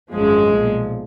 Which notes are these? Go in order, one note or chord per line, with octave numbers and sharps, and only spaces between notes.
G#1 F#2 F3 G#3
B1 A#2 F3